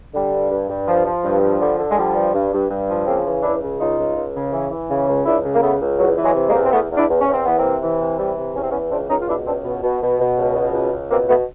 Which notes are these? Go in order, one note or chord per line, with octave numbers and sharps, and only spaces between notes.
D3 G3
G2
G2
G2
F3
F3
G2
F3
D3 G3
D3
G#3
F3 G3
G2
G2
G2
G2
F3
C#3 A#3 C4
E3
C#2 D4 E4
C#3
C#2 D#4 F4
C#2
C#2
C#3
E3
E3
C#3
C#2
C#2 D4 E4
C#3
A#3
C#2 A3 B3
C#2
E2 F#3
E3
F#3 G#3
C3
G#3 A#3
E2
C4
E2 A3 B3
E2
D4 E4
E2
C#4
E2
C4
E3 B3
A#3 C4
C3
E3
C3
E3 G3
C3
E2 C#4
C4
B3 C#4
E3
C#2 C4 D4
C#2 C#4 D#4
F4
B2 D4 E4
C#2 C4 D4
B2
B2
B2
B2
C#2
B2
C#2
C#2
B2 A#3 C4
B2 A3 B3